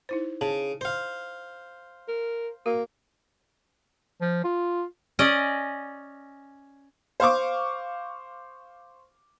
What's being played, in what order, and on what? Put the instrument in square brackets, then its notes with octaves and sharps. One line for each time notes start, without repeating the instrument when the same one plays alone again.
[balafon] D#4 E4 C5
[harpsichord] C#3 [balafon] A5
[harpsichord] C5 F5
[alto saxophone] A#4
[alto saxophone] A#3 [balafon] F#4
[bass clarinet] F3
F4
[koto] C#4 D5 D#5
[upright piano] C5 F5 C#6 D6